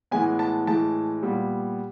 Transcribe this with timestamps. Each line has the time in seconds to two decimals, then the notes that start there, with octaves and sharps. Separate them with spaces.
0.11 A2 E3 G#3 B3 G#5
0.39 A5
0.67 A2 E3 G#3 A5
1.22 A#2 G3 B3